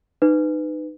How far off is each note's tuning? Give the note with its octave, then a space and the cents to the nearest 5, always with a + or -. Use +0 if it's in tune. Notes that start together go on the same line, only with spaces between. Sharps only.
D#4 -20 B4 +15